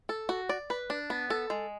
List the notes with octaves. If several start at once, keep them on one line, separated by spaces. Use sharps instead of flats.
A4
F#4
D5
B4
D4
B3
A4
G#3